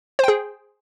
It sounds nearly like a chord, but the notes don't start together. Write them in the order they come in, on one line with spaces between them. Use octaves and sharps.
C5 G5 G#4